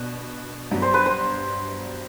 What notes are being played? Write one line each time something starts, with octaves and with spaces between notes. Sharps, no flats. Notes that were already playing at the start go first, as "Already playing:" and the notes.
Already playing: B2 D4 B4
G2 F#3 B3 D4
C5
B4
C5